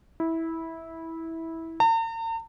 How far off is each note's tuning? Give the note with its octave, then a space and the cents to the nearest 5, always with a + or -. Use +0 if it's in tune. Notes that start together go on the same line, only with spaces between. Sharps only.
E4 -15
A#5 -45